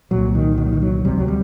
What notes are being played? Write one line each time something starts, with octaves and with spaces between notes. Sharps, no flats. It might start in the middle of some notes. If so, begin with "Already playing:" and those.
C2 A#2 F#3
D#3
D#3
F#3
D#3
F#3
D2 C3 G3
F#3
G3